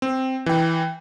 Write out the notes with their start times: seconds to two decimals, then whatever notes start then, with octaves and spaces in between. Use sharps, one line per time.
0.02 C4
0.46 E3 G5